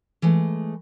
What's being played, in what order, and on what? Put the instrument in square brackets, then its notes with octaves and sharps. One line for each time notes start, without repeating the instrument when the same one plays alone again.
[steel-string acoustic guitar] E3 G#3 A3